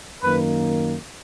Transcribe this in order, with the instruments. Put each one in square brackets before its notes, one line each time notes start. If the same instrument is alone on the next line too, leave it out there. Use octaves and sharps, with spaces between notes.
[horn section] F#2 D#3 A#3 B4